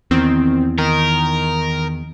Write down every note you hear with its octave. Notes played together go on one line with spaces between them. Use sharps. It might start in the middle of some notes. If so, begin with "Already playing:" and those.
E2 D#3 C4
D#3 A#4